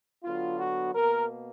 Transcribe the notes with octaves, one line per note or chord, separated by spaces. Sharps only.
D3 F#3 B3 F4
F#4
B2 A#3 A#4